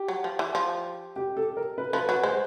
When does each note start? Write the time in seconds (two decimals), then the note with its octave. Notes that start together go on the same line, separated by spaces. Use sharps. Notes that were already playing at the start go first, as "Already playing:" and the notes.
Already playing: G4
0.08 F#3
0.24 F3
0.39 E3
0.55 F3
1.16 G4
1.37 A4
1.57 A#4
1.78 B4
1.93 F3 B4
2.09 F#3 B4
2.23 G#3 C5